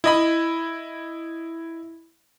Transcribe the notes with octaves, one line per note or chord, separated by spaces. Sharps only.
E4 D#5 B5